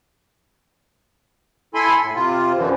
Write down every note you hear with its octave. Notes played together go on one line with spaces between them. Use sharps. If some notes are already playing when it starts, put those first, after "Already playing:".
E4 A4 G#5 B5 C6
A2
C3 F4
F#2 D3 E3 F3